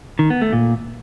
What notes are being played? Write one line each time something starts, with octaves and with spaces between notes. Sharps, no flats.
D#3
B3
A3
A#2